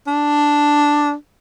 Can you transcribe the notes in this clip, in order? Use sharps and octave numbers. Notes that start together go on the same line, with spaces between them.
D4